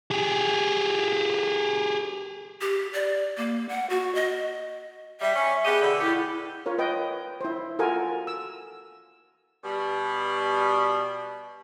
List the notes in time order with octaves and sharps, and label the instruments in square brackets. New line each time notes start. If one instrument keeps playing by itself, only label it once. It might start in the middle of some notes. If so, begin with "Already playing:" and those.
[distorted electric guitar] G4 G#4
[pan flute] G4
D5
A#3
F#5
F#4
D#5
[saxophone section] G3 [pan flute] E5
[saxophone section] C#4
[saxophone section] B3 G4 D#5 [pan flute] G#4
[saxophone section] B2 D3
[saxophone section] A2 G4 [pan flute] E4
[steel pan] F4 A#4 C#5
B4 D#5 G5
E4 C5
F4 F#4 A4 A#4 G#5
E6
[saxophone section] B2 G3